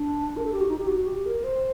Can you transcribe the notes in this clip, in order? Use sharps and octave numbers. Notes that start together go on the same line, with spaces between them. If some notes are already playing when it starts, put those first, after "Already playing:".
Already playing: D4
A#4
A4
G4
F#4
D#4
G4
F#4
G4
A#4
C5